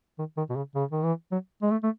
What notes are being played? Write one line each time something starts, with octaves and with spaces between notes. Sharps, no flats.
D#3
D#3
B2
C#3
C#3
D#3
E3
F#3
G#3
A3
A3